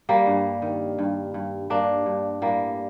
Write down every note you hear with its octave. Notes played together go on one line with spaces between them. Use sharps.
G3 A#3
G2
D#3
G2
G2
G2 A#3 D4
G2
A2 G3 A#3